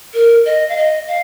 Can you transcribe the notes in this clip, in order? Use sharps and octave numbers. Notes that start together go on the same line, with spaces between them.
A#4
D#5
F5
D#5
F5